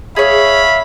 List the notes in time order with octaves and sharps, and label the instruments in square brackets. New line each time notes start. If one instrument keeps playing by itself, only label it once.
[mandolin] G#4 C#5 [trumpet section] E5 F5 B5